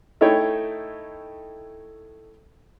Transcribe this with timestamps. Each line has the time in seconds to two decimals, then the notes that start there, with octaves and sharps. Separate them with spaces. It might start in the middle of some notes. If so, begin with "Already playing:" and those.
0.21 A3 D#4 E4 C#5 G5